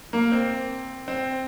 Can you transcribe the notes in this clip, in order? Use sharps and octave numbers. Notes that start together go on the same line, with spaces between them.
A#3
C4
C4